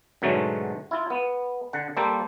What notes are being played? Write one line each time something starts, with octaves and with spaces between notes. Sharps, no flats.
G#2 B2 D3 F#3 A3 C#4
E4 F4
B3
D3 F#5
G3 A#3 A4 C5